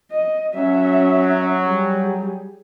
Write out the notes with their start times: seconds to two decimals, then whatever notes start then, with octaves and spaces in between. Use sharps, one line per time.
0.11 D#5
0.54 F#3 C#4 E5
1.67 G3 G#4